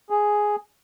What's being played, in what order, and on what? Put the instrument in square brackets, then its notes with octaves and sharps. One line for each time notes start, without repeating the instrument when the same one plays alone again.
[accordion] G#4